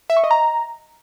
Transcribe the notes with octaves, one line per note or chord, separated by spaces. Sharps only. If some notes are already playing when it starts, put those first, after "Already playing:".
E5
C#6
D#5
A#5